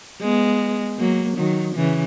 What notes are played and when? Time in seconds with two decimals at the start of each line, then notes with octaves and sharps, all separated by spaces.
0.21 G#3 B3
0.99 F#3 A#3
1.38 D#3 F#3
1.76 C#3 E3